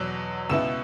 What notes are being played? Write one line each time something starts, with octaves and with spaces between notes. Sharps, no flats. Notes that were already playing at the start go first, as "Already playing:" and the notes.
Already playing: E2 B2 F#3 E6
C#2 B2 B3 E4 E6 E7